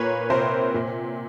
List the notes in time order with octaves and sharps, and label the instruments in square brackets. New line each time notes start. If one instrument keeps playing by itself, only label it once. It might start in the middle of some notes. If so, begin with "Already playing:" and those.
Already playing: [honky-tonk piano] A#2 A#3 B4 C#5
C3 A#4 C5
A#2